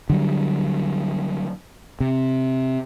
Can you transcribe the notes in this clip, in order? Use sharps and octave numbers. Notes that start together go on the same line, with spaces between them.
D3 F#3 G3
C3